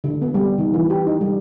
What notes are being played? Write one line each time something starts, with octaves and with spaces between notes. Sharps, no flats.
D3
B3
G3
D#3
E3
G4
D#4
G3